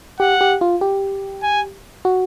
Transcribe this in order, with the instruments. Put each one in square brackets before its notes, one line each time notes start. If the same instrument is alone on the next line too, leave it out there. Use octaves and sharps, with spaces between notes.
[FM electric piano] G4 [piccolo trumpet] F#5
[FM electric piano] G4
F4
G4
[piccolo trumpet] G#5
[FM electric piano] F#4